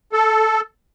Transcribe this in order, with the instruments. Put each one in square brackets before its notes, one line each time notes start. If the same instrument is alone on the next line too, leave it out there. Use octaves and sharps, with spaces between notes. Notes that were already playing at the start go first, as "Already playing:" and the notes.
[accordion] A4